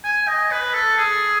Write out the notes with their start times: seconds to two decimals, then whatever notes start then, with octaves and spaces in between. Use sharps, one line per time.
0.04 G#5
0.28 D#5
0.51 B4
0.74 A4
0.97 G#4